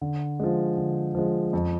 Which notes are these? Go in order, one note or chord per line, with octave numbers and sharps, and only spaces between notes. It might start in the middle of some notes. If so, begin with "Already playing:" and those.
D3
F3 G#3
D3
F3 G#3
F2